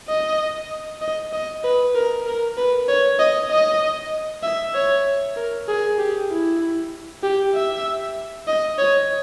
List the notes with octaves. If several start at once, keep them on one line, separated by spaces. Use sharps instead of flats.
D#5
D#5
D#5
B4
A#4
A#4
B4
C#5
D#5
D#5
E5
C#5
A#4
G#4
G4
E4
G4
E5
D#5
C#5